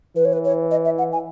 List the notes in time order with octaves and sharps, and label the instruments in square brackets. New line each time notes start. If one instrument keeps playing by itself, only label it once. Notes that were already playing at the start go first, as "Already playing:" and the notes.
[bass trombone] E3 [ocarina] B4
[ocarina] C#5
B4
C#5
D#5
E5
F#5
G#5